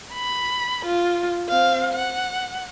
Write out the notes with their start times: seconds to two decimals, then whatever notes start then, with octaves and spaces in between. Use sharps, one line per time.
0.13 B5
0.85 F4
1.49 C4 F5
1.94 F#5